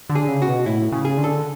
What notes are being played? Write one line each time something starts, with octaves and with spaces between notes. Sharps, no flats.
D3
G#4
C#3
F#4
B2
A2 E4
C#3
G#4
D3
A4